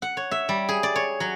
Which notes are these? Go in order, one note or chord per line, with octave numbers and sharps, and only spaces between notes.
F#5
C#5
E5
G3
G#4
D5
C#5
F#3